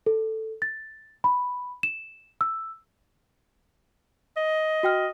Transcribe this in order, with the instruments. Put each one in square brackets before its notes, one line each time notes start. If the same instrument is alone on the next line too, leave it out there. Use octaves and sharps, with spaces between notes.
[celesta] A4
A6
B5
E7
E6
[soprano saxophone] D#5
[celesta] F#4 G5 F6